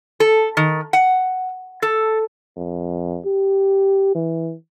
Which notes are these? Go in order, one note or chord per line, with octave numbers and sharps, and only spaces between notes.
A4
D#3
F#5
A4
F2
G4
E3